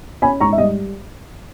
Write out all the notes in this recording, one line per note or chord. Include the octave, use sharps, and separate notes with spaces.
C#4 G#5 B5
G#2 A#5 C#6
E5
G3 D#5